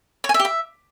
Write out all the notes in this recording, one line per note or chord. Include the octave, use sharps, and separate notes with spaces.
C#5
G#5
E5
G4
E5